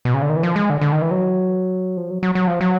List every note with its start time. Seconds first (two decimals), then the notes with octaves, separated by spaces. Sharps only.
0.05 B2
0.14 C#3
0.22 D3
0.29 D#3
0.36 E3
0.43 F3
0.56 G#3
0.70 D3
0.81 D3
0.92 D#3
1.02 E3
1.11 F#3
1.97 F3
2.11 F#3
2.23 F#3
2.35 F#3
2.47 F3
2.61 F#3